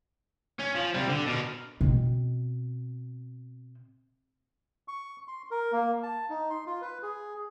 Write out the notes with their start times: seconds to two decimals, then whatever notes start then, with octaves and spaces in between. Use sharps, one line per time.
0.60 C#4
0.75 F3
0.94 C3 G3
1.09 D3
1.26 B2 A#4
1.81 B2 C4
4.88 C#6
5.28 C6
5.51 A#4
5.72 A#3
6.03 A5
6.30 D#4
6.50 C6
6.66 F4
6.82 B4
7.03 G#4